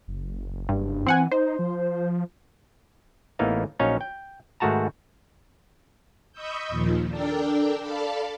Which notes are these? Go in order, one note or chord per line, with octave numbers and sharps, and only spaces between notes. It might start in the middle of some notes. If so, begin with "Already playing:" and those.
F#1
G2
E3 C4 F#5 G#5
D#4 C5
F3
A1 E3 A#3 B3 D#4 F5
A#1 F#3 C#4 D#4 C#5 F5
G5
G#2 D#3 A3 F#4 A5 A#5
D#5 B5 C#6 D#6 E6 G6
D#2 A#2 D#3 F3
D4 A4 A#4 D5 G5
A4 D5 F5 A5 B5